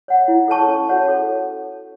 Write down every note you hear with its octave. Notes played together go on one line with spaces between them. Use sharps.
C#5 F#5
E4
A4 C#5 A5 C#6
C#4
F#4 C#5 F#5 A5
A4